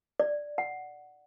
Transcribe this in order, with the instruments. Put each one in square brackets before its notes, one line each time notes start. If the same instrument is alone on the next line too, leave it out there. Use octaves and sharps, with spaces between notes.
[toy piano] D5
F#5